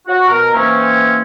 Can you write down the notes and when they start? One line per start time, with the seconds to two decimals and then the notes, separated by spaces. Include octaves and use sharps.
0.07 F#4
0.27 B2 A#4
0.54 E3 A#3 C4 C#4